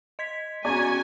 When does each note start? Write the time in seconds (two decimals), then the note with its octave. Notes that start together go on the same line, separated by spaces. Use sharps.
0.19 D#5 G#6 B6
0.65 B3 C#4 F#4 D5 G#5 A#5 C#6